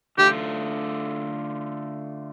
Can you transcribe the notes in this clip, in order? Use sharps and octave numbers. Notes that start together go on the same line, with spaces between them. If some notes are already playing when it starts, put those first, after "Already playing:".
D3 A3 F4 G4